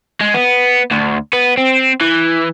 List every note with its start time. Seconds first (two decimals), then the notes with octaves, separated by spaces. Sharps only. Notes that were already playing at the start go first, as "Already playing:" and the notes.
0.21 G#3
0.34 B3
0.91 D2
1.33 B3
1.57 C4
2.01 E3